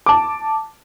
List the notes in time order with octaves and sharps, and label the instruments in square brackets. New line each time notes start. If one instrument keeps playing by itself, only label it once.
[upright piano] A5 D6